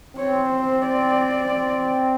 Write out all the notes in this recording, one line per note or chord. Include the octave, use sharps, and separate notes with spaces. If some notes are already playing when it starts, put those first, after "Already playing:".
C4 C#5
C5
D5
C4